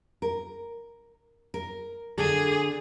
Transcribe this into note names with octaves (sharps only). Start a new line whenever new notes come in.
A#4
A#4
D3 D4 G#4 A4